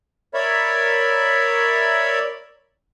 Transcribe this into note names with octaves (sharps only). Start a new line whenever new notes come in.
A#4 C#5 D5 E5 B5